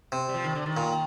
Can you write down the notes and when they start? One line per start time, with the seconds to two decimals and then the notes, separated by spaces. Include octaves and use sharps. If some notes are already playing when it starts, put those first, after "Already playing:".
0.12 C3
0.28 G3
0.34 F3
0.44 D#3
0.55 D3
0.66 D#3
0.77 A#2